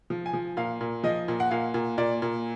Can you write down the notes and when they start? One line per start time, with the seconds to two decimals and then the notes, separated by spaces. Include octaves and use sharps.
0.10 F3
0.26 G#5
0.33 F3
0.57 A#2 F5
0.81 A#2
1.04 F3 D#5
1.28 A#2
1.40 F#5
1.51 A#2 F5
1.74 A#2
1.98 A#2 D5
2.22 A#2